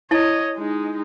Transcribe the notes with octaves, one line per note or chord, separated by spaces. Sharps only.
E4 C#5 D#5 A5
G#3 D#4